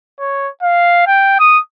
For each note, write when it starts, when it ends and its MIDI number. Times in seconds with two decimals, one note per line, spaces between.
0.20 0.49 73
0.63 1.03 77
1.07 1.37 79
1.39 1.59 87